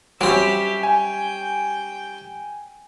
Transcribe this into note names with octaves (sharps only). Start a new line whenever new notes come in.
F#3 G3 C4 C#4 G4 E5
G5 G#5